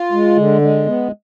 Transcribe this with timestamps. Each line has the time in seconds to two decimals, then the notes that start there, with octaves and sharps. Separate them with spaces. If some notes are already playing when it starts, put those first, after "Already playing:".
Already playing: F4
0.12 G#3
0.37 D3
0.61 G#3
0.86 B3